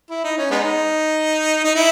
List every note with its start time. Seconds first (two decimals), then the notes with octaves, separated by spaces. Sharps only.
0.10 E4
0.24 D#4
0.38 C#4
0.51 G#3 B3 D#4
1.64 D#4
1.75 E4